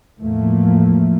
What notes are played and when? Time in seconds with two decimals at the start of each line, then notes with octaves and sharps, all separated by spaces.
0.21 E2 A2 F3 A3 A#3